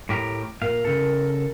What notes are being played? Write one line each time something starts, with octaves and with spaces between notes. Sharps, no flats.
A2 G4 A#4
A#2 A#4 F5
C#3 A4